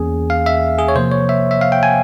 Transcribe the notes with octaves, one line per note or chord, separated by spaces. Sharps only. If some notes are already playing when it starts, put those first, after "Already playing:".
Already playing: E2 E3 A#3 C#4 G#4
F5
E5
G#4
C#5
C3 F3 A#3 C5
C#5
E5
E5
F5
G5
G#5